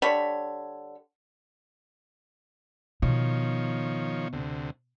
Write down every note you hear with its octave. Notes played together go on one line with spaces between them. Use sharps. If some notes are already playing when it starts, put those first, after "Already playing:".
D3 G3 C#5 B5
B2 D#3 F3 C#5
D2 C3